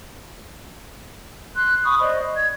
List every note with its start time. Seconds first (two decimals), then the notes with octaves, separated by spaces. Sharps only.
1.53 C6 F#6
1.84 B5 C#6 D#6
2.00 C5 D5 D#5
2.35 G#6